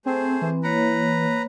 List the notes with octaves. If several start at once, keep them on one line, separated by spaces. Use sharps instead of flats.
A3 C4 G#4 C5
E3 C4
A#3 B4 C#5 A#5